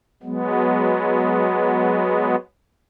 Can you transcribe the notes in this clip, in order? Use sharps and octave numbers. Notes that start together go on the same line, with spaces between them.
F#3 G#3 B3